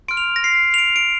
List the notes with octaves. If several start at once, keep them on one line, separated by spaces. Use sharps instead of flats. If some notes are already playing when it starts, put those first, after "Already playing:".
C6 F6 D7
F7
A#6
C7
F7
D7
D7